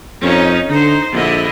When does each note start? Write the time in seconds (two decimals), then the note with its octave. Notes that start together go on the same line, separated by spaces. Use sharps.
0.23 F2 C#4 D#4
0.70 D3 D#4 C5
1.13 A#1 D3 E4 D#5